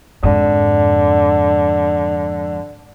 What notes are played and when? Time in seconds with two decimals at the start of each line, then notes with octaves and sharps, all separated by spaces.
0.23 F2 G#2 D3